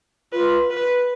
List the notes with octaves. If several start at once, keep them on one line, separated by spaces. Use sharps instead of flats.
F4 B4
B4